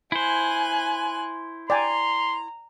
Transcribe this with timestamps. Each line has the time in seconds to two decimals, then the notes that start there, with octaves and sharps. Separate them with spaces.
0.12 E4 C5 G#5 F#6
1.70 D5 G5 G#5 A#5 C6